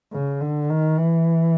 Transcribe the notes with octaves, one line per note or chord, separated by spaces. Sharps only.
C#3
D3
D#3
E3